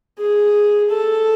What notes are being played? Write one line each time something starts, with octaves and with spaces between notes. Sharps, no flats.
G#4
A4